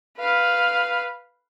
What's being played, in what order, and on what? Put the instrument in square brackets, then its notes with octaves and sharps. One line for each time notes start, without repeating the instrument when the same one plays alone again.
[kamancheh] B4 F5